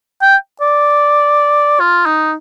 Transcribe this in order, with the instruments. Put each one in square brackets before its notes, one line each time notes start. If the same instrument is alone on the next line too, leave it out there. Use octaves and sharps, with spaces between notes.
[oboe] G5
D5
F4
D#4